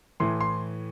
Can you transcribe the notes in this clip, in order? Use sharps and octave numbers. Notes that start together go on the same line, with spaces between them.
A2 E3 C6
C6